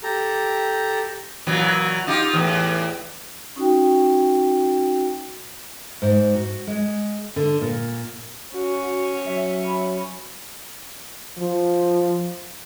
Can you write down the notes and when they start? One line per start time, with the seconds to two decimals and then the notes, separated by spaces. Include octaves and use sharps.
0.03 G4 A4 A#5
1.47 A#2 E3 F#3
2.07 D#4 F4 G4
2.34 E2 A2
3.56 C#4 D#4 F#4 G5
6.02 G#2
6.35 F#4
6.67 G#3
7.36 D3
7.61 A#2
8.54 C#4 F#4
9.26 F#3 E5
9.65 B5
11.38 F3